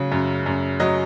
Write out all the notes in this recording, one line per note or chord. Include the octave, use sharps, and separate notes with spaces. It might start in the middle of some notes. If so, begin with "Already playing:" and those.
Already playing: C#3 F#3
F#2
F#2
F#3 D#5